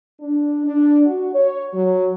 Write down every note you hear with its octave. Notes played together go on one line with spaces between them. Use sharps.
D4
D4
F#4
C#5
F#3